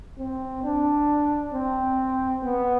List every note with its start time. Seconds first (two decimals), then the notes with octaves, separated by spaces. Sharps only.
0.19 C4
0.64 D4
1.53 C4
2.43 B3